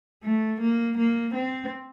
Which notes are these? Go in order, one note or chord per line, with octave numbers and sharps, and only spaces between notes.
A3
A#3
A#3
C4